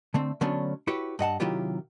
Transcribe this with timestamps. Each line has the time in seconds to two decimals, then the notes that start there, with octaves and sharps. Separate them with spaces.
0.14 D3 A3 C4
0.41 D3 F#3 A3 B3 C#4 D4
0.87 E4 F#4 G4 B4 C#5
1.19 G2 D#5 F#5 A5
1.40 C3 D#3 F#3 E4 F4 G4